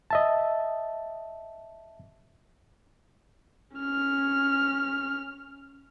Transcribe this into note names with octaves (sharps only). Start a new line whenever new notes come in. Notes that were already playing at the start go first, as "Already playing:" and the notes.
D#5 E5 A5
C#4 F6